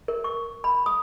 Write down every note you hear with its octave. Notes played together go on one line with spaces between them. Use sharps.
A#4
C#6
B5
D#6